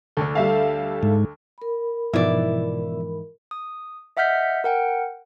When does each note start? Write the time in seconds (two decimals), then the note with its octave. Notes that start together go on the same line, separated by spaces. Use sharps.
0.17 D2 D3 A4
0.35 G3 E5 F5
1.03 G#2
1.58 A#4 B5
2.13 G#2 B2 E3 F3 E4 D5
3.51 D#6
4.17 D#5 E5 F#5 F6 G6 B6
4.64 A#4 F#5 G5